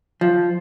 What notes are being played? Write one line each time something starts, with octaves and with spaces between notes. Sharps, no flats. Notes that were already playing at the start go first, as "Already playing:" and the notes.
F3